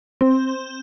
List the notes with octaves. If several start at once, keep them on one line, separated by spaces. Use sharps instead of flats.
C4